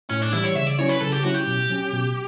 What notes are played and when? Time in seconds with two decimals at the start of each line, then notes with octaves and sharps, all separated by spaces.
0.09 A2 C#4
0.22 D4
0.32 E3 G3 E4
0.44 C#5
0.55 C#3 E5
0.67 D5
0.79 F#3 C#4 E4 C#5
0.89 B4
1.01 C#3 A4
1.12 G4
1.23 F#3 C#4 E4 F#4
1.34 G4
1.47 B2
1.70 F#3 C#4
1.92 B2